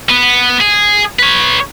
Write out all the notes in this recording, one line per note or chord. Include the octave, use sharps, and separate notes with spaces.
B3
G#4
B4 C#5